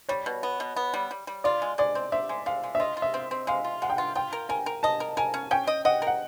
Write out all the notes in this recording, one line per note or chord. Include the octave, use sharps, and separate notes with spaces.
G3 C#5
B2
B3
B2
B3
G3
G3
G3
F4 D5
G#3
G#3 D5
C4
C4 E5
G#3
G#3 F5
G#3
E5
F4 D#5
F4
E5
C4
C4
G#3 F5
F4
G#3 F#5
G5
F4 F#5
F4 G5
A#4
A#4 G#5
A#4
D#5 A5
A#4
A#4 G#5
C#4
C#4 G5
D#5
D#5 F#5
A#4
F#5